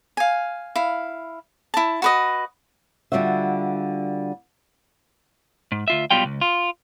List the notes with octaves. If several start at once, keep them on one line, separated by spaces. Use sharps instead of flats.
F5 G#5
E4 F5
E4 A5
F#4 B4 D#5
D3 G3 F4 F#4 E5
G#2
D2 F4 E5
B1 B2 G3 F4 G5
C#2
F4